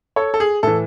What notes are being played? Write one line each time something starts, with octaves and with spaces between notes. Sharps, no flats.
A4 C#5
A4
G#4
A2 E3 A4